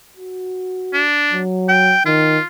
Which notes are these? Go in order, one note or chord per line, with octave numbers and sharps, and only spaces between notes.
F#4
D4
F#3
G5
D#3 F4